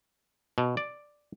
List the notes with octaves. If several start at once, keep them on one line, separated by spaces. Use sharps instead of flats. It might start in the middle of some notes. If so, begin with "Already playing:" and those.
B2
D5